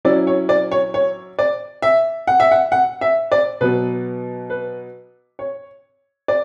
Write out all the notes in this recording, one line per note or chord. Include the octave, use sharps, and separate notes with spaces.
F#3 C#4 E4 D5
C#5
D5
C#5
C#5
D5
E5
F#5
E5
F#5
F#5
E5
D5
B2 F#3 B3 B4
B4
C#5
D5